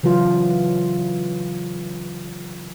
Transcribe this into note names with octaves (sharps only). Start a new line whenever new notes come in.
C#3 E3 F#3 F4